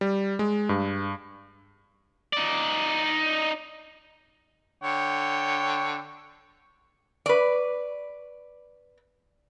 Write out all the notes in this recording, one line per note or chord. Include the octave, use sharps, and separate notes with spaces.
G3
G#3
G2
D#4 D5
D3 C#5 G5
B4 D5